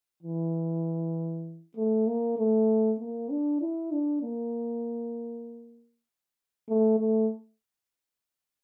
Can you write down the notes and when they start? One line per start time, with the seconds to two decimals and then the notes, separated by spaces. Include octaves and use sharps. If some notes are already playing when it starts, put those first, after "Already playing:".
0.23 E3
1.76 A3
2.07 A#3
2.38 A3
3.00 A#3
3.30 D4
3.61 E4
3.92 D4
4.22 A#3
6.69 A3
6.99 A3